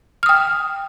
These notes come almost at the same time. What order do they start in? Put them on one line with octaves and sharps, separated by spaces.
F6 D#6 G5